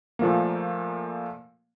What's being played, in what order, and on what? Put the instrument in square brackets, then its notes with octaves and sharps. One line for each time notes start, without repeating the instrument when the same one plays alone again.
[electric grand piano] A#2 F3 A3 A#3